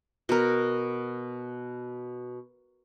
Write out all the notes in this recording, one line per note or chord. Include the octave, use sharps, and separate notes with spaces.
B2 A#4